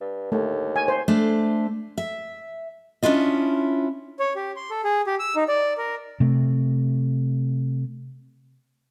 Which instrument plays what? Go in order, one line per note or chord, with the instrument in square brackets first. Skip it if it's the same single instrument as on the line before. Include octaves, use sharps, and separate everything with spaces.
[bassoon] G2
[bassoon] D#2 [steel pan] A3
[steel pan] G#5
C5
[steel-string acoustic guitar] A3 D4 C5
E5
C#4 D4 E4 F4 D#5
[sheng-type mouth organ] C#5
G4
C6
A4
G#4
G4
E6
D#4
D5
A#4
[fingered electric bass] C3 A3